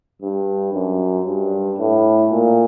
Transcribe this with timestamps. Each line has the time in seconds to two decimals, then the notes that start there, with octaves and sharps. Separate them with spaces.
0.22 G2
0.73 F#2
1.26 G2
1.79 A2
2.31 A#2